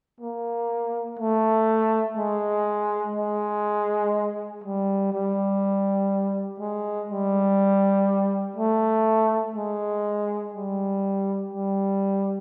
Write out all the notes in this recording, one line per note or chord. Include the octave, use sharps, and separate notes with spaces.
A#3
A3
G#3
G#3
G3
G3
G#3
G3
A3
G#3
G3
G3